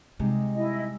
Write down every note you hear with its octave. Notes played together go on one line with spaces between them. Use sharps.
C3 G3 G#3 D#4
E4 D#5